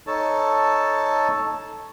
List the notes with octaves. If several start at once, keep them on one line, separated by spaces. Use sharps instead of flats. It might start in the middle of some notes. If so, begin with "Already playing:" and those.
D#4 A4 C#5 A5